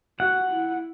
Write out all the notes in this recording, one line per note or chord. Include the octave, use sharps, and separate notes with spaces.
F#4 F#5
E4